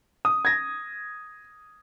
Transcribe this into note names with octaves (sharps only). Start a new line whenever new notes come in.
D#6
G#6 A#6